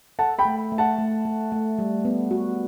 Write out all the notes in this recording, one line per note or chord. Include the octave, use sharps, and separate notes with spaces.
A4 F#5 A5
G5 B5
A3
A3
F#5 A5
A3
A3
A3
G3
B3
F#4